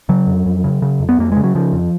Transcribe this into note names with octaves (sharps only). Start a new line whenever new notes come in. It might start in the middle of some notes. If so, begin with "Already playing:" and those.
C#3 F#3
F2
F2
C#3
C#3
F2
B3
F2 A#3
C#3 G#3
F#3
C#3 F3
F2